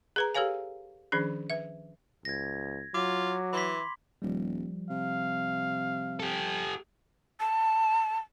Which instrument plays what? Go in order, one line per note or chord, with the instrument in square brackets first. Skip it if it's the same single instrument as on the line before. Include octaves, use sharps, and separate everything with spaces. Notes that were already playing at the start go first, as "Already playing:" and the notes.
[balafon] G#4 B4 A#5
G4 A4 B4 C#5 F5 G#5
D#3 F3 C#4 D4 G#4
B4 E5
[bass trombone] C#2 [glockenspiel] G#6 A#6
[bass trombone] F#3 [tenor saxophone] F4 [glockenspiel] D6
[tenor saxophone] E3 [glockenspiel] B5 C6 B6
[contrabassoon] D#1 [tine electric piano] F3 G3
[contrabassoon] C3 [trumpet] F5
[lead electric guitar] G4 A4
[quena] A5